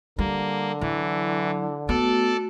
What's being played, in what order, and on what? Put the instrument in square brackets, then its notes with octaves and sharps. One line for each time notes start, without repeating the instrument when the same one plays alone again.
[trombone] D3 [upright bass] G3 [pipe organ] A#3
[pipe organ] E3 [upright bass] F#3 [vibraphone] E4
[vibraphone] A3 F#4 [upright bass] B3 [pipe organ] A4 D5